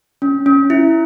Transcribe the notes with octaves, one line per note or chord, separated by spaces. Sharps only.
C#4
C#4
E4